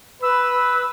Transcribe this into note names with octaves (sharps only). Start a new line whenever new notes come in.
B4 E6